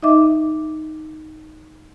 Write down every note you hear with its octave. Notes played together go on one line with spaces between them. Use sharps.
D#4 D#5 E5 D6